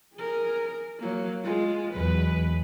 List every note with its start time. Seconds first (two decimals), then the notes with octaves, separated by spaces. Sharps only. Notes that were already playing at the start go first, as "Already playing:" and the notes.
0.15 G#4 A#4
0.99 F#3 A#3
1.44 G#3 F4
1.93 E2 F#3 G#3 B4